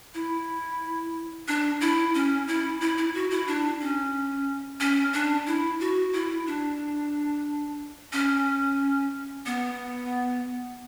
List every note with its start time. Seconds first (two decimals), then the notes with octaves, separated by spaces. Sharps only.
0.14 E4
1.48 D4
1.81 E4
2.14 C#4
2.48 E4
2.81 E4
2.97 E4
3.14 F#4
3.31 E4
3.47 D4
3.81 C#4
4.80 C#4
5.13 D4
5.47 E4
5.80 F#4
6.13 E4
6.46 D4
8.13 C#4
9.46 B3